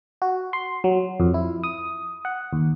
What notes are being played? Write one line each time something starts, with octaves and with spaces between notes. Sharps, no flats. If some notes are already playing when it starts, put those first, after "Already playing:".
F#4
C6
F#3
F2
E4
D#6
F#5
D#2